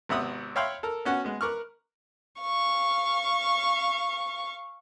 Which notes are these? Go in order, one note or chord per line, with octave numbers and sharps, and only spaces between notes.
G#1 C3 B3 E5 B5 D#6
C#5 E5 F5 G5 B5 C6
A4 A#4
B3 C#4 F#4
G#3 B3
A#4 B4 C#6 D6 F6
F5 C#6